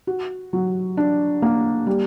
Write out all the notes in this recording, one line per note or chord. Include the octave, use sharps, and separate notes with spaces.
F#4
F#3
D4
A#3
G3